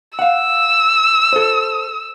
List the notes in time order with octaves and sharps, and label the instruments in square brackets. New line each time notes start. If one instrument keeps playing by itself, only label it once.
[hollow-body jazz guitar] F5 F#5 [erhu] E6
[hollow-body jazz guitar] A4 C5